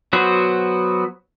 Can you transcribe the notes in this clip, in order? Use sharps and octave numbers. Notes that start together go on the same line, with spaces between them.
F#3 B3 F#4 C5